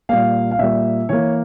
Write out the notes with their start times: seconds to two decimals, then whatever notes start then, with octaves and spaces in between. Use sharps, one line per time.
0.09 A#2 G3 A#3 F5
0.51 F5
0.59 A#2 G3 A#3 E5
1.09 E3 A#3 C#5